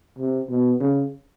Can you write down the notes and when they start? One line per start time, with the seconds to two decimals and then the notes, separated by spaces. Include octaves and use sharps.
0.18 C3
0.49 B2
0.80 C#3